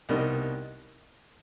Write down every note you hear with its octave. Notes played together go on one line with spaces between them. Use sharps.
C2 B2 G3 A#3 D#4